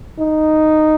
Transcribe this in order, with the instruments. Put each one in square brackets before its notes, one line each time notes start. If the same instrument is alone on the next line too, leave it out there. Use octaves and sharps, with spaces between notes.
[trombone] D#4